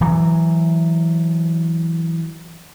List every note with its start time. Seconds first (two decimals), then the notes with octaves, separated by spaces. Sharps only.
0.01 E3 F#3